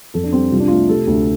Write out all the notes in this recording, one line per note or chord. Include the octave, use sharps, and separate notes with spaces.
F2 A4
D4
G3 C4
C2 F4
D4
A3 F4
C3 A4
D2